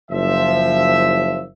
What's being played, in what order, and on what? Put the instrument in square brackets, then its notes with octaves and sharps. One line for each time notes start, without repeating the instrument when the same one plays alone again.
[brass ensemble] F#1 F3 E5